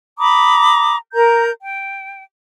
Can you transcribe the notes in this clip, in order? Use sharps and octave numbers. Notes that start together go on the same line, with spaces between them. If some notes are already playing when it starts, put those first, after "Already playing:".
A#5 B5 D6 D#6
A#4 A#5 G6
G5